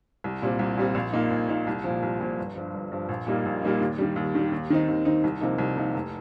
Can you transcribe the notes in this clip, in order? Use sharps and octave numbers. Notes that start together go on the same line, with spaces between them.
C2
A#2 G3 C4
C2
A#2 G3 C4
A#1
A#2 A#3 D#4
A#1
A#2 A#3 D#4
C2
A#2 F3
C2
A#2 F3
G1
G2 F3
G1
G2 F3
A#1
A#2 G3 A#3 D#4
A#1
A#2 G3 A#3 D#4
D#2
D#3 G3
D#2
D#3 G3
D#2
D#3 C4 D#4
D#2
D#3 C4 D#4
C2
C3 F3 A#3 D#4
C2
C3 F3 A#3 D#4
F1